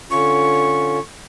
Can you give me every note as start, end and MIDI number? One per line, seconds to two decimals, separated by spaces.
0.11 0.99 50
0.11 0.99 61
0.11 0.99 65
0.11 1.00 85